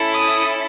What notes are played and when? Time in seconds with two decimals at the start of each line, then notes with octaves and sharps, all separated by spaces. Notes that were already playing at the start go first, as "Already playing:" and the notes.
Already playing: C#4 E4 A4
0.16 D#6